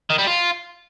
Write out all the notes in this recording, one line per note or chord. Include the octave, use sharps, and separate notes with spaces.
D#3
G3
F4